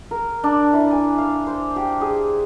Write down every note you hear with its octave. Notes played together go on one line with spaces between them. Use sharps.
A#4
D4
E3
G#5
F5
C5
G4
G#4